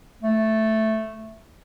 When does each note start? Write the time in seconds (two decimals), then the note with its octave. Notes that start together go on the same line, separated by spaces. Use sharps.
0.23 A3